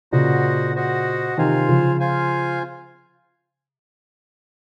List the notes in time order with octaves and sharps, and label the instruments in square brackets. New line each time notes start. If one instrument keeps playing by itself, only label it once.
[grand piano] A#2 C#3 [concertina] F#4 C5 D#5 F#5
[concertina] F#4 C5 D#5 F#5
[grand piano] C3 D#3 [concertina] F4 C5 F5 G#5
[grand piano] C#3 F3
[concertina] F4 C5 F5 G#5